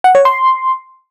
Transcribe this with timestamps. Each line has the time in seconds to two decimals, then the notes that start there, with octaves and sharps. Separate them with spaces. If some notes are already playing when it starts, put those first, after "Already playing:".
0.04 F#5
0.15 C#5
0.25 C6